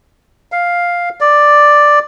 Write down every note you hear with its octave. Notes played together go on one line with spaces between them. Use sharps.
F5
D5